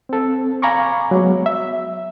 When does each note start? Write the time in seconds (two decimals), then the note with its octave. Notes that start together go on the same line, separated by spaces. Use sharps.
0.09 C4 A4
0.62 F5 G#5 A#5 B5 C#6 D6
1.11 F#3 G#3 B3
1.46 E5